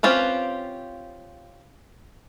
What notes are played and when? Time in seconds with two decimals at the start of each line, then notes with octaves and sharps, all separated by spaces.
0.03 C4 C#4 F4 G4 B4